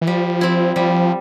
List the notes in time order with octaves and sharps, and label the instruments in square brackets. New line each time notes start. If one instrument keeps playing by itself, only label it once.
[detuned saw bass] E3
[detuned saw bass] F3 [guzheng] G3
[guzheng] C4 E4
[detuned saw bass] F3 [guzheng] G3